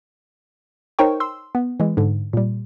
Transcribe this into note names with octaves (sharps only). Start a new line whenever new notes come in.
D#4 A#4 C5 C#5 G5 C#6
C6 E6
B3
E3 G#3
G#2 D3
A#2 G3